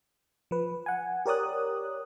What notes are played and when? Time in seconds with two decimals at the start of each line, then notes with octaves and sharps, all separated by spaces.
0.51 F3 B4
0.86 F#5 G#5
1.26 G4 A#4 C#5 D5 D#6 F#6